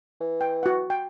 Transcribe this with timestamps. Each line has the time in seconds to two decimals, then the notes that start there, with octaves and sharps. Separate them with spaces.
0.21 E3
0.41 G5
0.63 F#4 F#5
0.90 G5